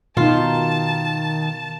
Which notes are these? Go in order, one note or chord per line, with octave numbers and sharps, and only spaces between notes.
B2 D#3 D#4 F4 A5